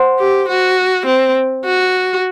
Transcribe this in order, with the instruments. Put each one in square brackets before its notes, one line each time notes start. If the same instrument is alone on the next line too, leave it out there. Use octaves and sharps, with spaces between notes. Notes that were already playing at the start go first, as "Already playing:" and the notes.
Already playing: [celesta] C5 F#5 C6
[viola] G4
F#4
C4
F#4